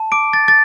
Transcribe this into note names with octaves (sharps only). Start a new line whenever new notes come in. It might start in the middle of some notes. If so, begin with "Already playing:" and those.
Already playing: A5
D6 D7
A6
A6